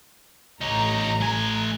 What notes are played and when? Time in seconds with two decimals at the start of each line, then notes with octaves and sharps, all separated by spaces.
0.61 A1 D#4 C#5 A#5
1.21 A3 G#5